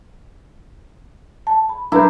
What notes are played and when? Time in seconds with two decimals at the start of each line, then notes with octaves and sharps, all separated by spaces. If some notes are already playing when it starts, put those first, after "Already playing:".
1.47 A5
1.69 B5
1.92 F#3 D4 E4 A#4 B4 G6